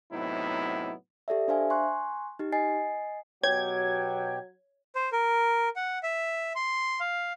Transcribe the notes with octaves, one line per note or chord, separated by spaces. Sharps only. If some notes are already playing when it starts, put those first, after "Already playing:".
A2 C3 F#3 B3 D#4 E4
G4 A4 D5 E5
D4 C5 E5 F5 G#5
G#5 C6 C#6 F#6
D#4 G4
D#5 G#5 A6 C7
B2 F#3 G4 C#5 G5 G#6
C5
A#4
F#5
E5
C6
F5